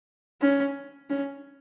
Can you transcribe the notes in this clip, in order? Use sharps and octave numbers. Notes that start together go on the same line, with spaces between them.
C#4
C#4